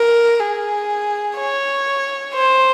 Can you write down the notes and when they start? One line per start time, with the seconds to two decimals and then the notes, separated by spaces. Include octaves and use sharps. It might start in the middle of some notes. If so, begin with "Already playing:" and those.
Already playing: A#4
0.40 G#4
1.37 C#5
2.34 C5